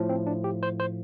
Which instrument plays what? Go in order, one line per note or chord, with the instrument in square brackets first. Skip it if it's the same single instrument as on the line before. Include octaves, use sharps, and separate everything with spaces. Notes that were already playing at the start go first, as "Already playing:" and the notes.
Already playing: [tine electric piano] A2 F3
C4
D4
G4
C5
C5